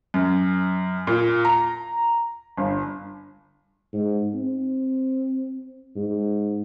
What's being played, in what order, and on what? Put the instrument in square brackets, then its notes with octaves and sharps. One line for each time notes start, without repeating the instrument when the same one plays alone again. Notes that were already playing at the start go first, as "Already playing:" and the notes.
[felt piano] F#2
A#2
A#5
G1
[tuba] G#2
C4
G#2